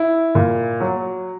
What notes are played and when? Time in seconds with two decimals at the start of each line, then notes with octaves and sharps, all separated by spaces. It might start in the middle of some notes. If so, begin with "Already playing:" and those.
Already playing: E4
0.35 A#2
0.80 F#3